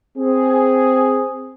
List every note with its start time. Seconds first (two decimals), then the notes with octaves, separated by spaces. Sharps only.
0.18 C4 G#4